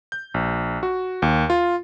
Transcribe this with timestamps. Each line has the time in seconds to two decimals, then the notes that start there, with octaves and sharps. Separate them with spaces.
0.12 G6
0.34 A#1
0.83 F#4
1.22 D#2
1.50 F4